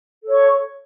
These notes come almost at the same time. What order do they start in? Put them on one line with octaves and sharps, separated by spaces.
A4 C#5 C#6